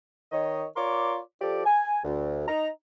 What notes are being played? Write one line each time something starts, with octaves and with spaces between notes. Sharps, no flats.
D#3 C#5 D#5
F4 A#4 C#5 D5 C6 D6
F3 G4 A4 D5
G#5
D2
D#4 A#5